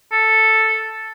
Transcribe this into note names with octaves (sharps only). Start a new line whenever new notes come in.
A4